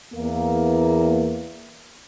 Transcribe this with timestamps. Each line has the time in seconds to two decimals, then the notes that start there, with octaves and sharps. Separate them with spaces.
0.14 E2 A#3